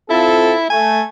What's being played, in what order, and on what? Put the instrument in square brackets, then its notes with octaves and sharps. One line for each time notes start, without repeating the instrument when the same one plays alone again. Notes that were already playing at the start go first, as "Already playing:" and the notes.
[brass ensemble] C4 F4 A4 [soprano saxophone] E4
[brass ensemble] A3 [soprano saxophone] G#5